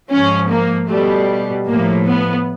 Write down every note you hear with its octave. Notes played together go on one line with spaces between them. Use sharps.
G#2 F3 C#4
A#3
B2 G3 A3
A2 F3 A#3
B3